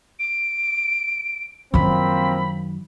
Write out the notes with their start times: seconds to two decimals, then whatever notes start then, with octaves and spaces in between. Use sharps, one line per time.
0.19 D7
1.74 F#2 D#3 F3 A#3 C4 B5